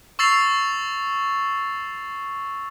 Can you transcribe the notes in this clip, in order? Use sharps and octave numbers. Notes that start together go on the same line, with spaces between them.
C#6 E6 A6 C7 F7